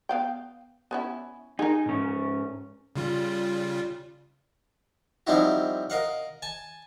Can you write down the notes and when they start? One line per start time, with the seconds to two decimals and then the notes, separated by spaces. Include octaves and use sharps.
0.09 B3 F5 G5
0.91 B3 C#4 E4
1.59 D#4 G#4 A#4
1.86 G#2 C#4
2.96 C#3 G3 F4
5.27 F3 G3 C4 D#4 E4 F#4
5.90 A#4 D#5 F5 F#5
6.42 G#5 A5